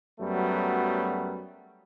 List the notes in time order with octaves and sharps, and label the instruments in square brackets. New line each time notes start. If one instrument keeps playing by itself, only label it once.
[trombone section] F#2 F#3 G3 A3 B3